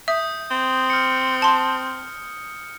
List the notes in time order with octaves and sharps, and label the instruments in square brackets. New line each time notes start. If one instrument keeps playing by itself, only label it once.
[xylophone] E5 [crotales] D#6 G6
[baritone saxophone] C4
[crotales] F6 C#7
[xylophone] A5 C6